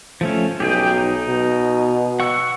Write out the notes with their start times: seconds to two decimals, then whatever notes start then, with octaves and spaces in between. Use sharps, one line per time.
0.21 F3 A3 C#4
0.60 B1 G4 G#4 G5
0.94 D#4
1.27 B2
2.20 F#5 C#6 E6